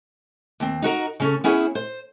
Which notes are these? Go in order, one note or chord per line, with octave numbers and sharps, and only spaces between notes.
D#2 C4
D#4 F#4 A#4 F#5
C#3 C#4 A4
B3 C#4 E4 G#4 C5 C#5
C5